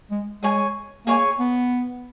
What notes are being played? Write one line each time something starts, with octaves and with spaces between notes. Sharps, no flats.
G#3
G#3 G#4 C#5 G#5
A#3 G#4 C#5 G#5
B3